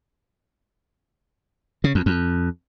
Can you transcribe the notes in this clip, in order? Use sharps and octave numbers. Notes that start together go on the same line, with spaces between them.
C#3
F2
F2